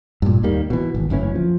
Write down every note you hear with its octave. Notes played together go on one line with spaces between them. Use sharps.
G2 A#2
D#2 D#3 G3 A#3
B2 E3
G#1
F#1 D2 E3 C#4
F3